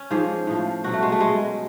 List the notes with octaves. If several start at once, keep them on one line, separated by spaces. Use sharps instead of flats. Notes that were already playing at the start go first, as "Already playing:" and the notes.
Already playing: C#4
G#2 F3 G#4
A2 F3
B2 F#3 F#4
A3
G#3
A3
B2 F#3 G#3